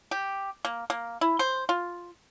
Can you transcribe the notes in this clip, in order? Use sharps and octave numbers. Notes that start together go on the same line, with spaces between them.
G4
A#3
A#3
E4
C5
F4